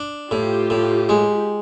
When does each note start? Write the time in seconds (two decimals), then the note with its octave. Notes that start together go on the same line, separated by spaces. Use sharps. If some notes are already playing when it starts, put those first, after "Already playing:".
Already playing: D4
0.31 A2 F4 G4
0.70 A2
1.09 G#3